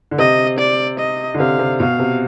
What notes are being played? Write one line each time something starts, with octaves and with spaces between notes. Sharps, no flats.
D3
C3 D#5
D5
D#5
D3
C3 F5
C3
B2 F5
C3